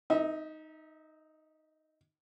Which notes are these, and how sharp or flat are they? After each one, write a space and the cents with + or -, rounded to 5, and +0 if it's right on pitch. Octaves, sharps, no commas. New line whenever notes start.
D#4 +0 E5 -35